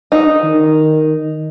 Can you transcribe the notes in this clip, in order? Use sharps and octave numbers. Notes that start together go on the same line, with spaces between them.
D#4
D#3